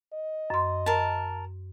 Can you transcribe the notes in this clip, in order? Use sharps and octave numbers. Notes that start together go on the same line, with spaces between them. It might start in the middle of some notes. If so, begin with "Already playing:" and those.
D#5
F#2 C6
A#4 A5